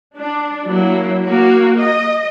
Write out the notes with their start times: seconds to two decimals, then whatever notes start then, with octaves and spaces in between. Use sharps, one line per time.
0.17 D4
0.66 F#3 A#3 E4
1.24 A#3 F#4
1.78 D#5